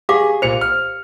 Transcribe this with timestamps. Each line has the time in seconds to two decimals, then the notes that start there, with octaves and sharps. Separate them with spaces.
0.09 G4 G#4 F5 D6
0.42 A#2 C5 C#7 F7
0.61 F6